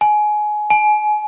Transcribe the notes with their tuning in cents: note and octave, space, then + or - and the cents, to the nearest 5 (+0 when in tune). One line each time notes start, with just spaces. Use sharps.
G#5 +20
G#5 +30